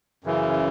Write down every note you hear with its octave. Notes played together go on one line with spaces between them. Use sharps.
F#2 C#3 E3